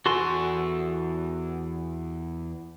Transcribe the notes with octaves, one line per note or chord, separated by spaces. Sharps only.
E2 F#4 A4 G#5 C6